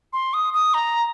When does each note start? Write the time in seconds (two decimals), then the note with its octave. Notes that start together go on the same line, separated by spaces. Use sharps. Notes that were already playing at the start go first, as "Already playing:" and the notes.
0.13 C6
0.34 D#6
0.54 D#6
0.74 A#5